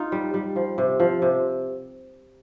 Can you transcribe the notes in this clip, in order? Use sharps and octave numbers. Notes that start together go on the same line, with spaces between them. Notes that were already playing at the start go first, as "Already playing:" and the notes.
Already playing: D#4 F4
G3
G3
F3
C3
F3
C3